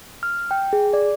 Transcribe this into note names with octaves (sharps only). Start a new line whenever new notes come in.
F6
G5
G#4
D5